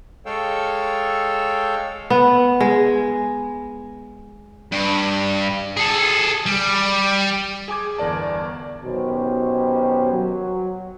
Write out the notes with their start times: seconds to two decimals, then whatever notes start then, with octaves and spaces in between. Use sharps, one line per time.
0.26 G#3 A4 C#5 F5 G5 E6
2.10 B3
2.60 G#3
4.72 G2
5.77 G#4 A4
6.46 G3
7.68 G#4 G#5 D6 G#6
7.98 G1 E2 A#4 D5 A5
8.83 B2 D#3 F#3 C#4 G4 C5
10.12 F#3